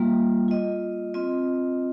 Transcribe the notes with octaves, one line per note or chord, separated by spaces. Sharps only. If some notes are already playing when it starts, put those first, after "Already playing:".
Already playing: G3 A#3 F4
F4 D#5
C4 F4 D#5